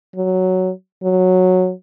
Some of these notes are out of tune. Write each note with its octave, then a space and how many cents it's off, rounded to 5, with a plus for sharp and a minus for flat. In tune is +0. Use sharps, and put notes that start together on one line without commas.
F#3 +5
F#3 -10